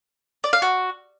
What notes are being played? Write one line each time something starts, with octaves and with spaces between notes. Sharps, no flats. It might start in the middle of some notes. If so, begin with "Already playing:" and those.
D5
F5
F#4